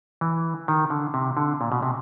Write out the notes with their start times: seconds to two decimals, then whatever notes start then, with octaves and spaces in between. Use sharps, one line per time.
0.21 E3
0.68 D#3
0.90 D3
1.14 C3
1.37 D3
1.61 A#2
1.72 B2
1.83 C3